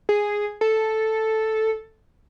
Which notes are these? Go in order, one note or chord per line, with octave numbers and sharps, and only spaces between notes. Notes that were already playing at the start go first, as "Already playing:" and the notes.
G#4
A4